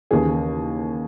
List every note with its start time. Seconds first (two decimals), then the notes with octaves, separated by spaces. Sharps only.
0.11 D#2 C#3 E3 G#4